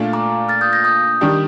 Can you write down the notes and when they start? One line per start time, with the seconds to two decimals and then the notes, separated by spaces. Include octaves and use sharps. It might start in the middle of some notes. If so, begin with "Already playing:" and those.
Already playing: A#2 A3 D4 F4
0.13 A#5 D6
0.49 F6 A6
0.61 D#6 G6
0.73 G6 A#6
0.85 D#6 G6
1.21 D#3 G3 D4 G4